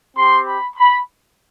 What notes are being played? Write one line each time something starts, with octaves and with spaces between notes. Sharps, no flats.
C4 G4 C6
B5
B5